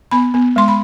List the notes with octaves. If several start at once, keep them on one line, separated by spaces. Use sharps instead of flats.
B3 B5
B3
G#3 C6
B5